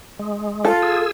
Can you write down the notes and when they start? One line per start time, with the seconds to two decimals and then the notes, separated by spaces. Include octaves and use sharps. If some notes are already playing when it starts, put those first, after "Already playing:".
0.19 G#3
0.65 F4 A4
0.82 G#4 E6